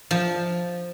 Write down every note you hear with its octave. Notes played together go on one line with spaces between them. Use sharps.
F3